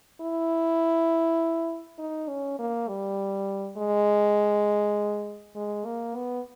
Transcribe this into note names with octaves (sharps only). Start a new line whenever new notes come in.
E4
D#4
C#4
A#3
G3
G#3
G#3
A#3
B3